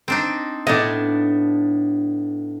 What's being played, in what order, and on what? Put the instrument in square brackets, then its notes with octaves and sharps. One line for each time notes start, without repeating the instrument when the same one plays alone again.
[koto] C4 D4 D#4
[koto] A2 B3 [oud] D4 D#5